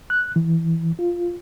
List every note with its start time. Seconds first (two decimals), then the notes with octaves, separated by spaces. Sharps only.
0.10 F#6
0.36 E3
0.99 F4